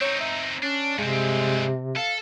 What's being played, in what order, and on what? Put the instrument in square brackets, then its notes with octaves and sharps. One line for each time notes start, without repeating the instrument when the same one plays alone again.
[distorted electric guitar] C4 D#4 [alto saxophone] C#5
[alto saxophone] E5
[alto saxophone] C#4 [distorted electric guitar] D4
[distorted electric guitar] G2 C4 [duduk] C3 [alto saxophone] G#3
[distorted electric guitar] A4 [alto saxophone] F5